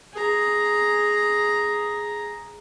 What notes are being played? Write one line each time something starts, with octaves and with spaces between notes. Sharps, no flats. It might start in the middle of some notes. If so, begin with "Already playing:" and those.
G#4 A#5